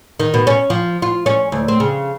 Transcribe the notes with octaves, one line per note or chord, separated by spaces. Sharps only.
D#3
B2
C#4
F3
F4
C#4
D2
C4
C#3